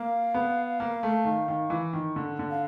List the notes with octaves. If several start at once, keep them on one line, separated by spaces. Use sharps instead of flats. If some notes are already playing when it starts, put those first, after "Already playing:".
Already playing: A#3 F5
B3
A#3
A3
D#3
D#3
E3
D#3
D3
D3
F5